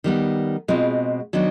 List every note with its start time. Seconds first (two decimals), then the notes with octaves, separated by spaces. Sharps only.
0.04 D#3 G3 B3
0.68 B2 G#3 C4 F4
1.33 D#3 F#3 B3 D4